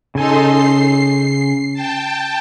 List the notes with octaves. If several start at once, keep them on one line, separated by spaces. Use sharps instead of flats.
C#3 D#4 A4 G#5 C6
C7
G5 A5